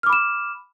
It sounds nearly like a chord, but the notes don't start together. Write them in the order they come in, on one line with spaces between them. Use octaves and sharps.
F6 D6 B5 E7